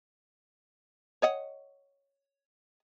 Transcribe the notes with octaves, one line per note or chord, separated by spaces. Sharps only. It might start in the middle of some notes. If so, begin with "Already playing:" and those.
C#5 D#5 F#5